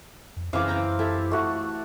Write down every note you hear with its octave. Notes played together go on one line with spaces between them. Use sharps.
F2
F#2 C#3 E3 C4 F5 D6
C4 G5 A#5
E4 G4 A4
A3 F#4